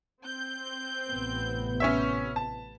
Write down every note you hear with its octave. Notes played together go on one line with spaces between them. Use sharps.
C4 G6
A1 C3 B3
C#4 C#5 E5
A5